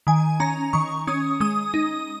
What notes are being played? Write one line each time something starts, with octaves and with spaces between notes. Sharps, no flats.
D#3 G#5
C#4 A#5
D#3 C#6
C#4 D#6
G#3 D#6
D#4